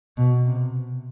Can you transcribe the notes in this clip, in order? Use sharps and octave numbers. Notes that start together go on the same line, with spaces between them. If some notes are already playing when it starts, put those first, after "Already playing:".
B2
C3